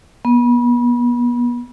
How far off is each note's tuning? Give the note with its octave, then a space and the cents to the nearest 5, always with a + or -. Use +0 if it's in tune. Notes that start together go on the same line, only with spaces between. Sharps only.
B3 -35